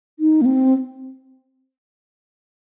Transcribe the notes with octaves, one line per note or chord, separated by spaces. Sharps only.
D#4
A#3
C4